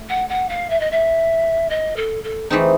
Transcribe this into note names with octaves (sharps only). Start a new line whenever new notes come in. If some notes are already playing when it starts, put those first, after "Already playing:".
Already playing: A3
F#5
F#5
F5
E5
D#5
E5
D#5
A4
A4
E3 A3 C4 D#4 G#4